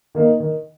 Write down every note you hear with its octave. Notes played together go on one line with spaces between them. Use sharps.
D#3 A#3 D#4
D#3